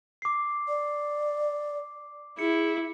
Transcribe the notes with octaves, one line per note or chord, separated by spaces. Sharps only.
D6 C7
D5
E4 G#4 C#7